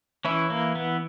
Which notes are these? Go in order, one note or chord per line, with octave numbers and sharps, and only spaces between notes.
E3 C#4 E4
A#3
B3